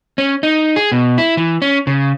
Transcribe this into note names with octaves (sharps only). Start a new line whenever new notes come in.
C#4
D#4
G#4
B2
E4
E3
C#4
C#3